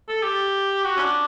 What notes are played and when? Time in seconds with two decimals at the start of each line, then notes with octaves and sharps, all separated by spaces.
0.09 A4
0.23 G4
0.84 F#4
0.97 C#4
1.00 D4